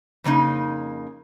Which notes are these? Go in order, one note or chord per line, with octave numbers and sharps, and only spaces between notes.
F2 C#3 A#3 D#4